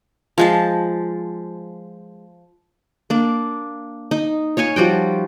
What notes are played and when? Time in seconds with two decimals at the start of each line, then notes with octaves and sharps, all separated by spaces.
0.38 F3 G#3 A5
3.10 A#3 D4
4.11 D#4
4.57 C#5 F5 G#5 C#6
4.76 F3 G3 F#4 G5